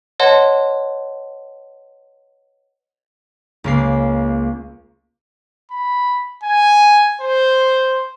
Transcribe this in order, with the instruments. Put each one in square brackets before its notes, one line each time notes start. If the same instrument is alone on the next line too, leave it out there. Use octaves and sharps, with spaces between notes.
[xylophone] B4 C#5 D#5 F#5 A5 C6
[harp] C#2 A#3 C7
[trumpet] B5
G#5
C5